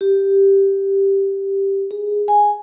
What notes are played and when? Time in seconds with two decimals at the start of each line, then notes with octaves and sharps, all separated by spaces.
0.01 G4
1.91 G#4
2.28 G#5